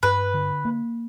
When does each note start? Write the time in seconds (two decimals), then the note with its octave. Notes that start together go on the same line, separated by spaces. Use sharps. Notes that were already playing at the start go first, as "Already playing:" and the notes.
0.03 G2 B4
0.34 D3
0.65 A#3